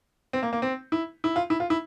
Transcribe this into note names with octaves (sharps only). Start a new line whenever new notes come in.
C4
A#3
A#3
C4
E4
E4
F4
E4
F4
E4